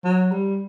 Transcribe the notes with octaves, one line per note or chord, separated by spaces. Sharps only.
F#3
G3